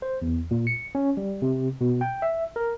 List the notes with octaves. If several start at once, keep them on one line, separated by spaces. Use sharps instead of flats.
C5
E2
A#2
C#7
C#4
G3
C3
B2
G5
E5
A#4